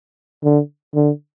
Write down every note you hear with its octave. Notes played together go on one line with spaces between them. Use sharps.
D3
D3